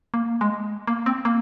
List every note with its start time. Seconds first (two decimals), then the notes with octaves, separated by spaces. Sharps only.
0.14 A#3
0.41 G#3
0.87 A#3
1.06 C4
1.25 A#3